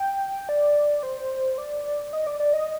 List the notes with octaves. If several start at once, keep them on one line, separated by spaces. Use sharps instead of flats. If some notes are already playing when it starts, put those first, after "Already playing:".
Already playing: G5
D5
C5
D5
D#5
D5
D5
D#5